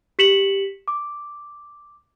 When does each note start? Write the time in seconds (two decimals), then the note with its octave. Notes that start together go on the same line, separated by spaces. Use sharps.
0.19 G4 B6 C#7 E7 F#7
0.88 D6